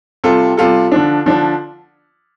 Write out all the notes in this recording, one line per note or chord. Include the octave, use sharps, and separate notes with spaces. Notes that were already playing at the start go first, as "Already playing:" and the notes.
C3 G3 F4 A4
C3 G3 F4 A4
D3 F3 D4
D3 F3 D4